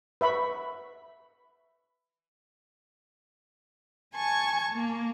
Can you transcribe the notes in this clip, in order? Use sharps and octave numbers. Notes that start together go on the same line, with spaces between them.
B4 E5 B5 C#6
G#5 A5 C#6 G#6
A#3